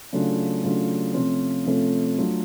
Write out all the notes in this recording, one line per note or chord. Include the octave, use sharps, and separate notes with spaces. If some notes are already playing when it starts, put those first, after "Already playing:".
C#3 F#3 A3 D4 F4
C#3 F#3 A3 D4 F4
C3 F3 A3 C#4 F4
C3 F3 A3 C#4 F4
F#3 A3 D4 F4 A4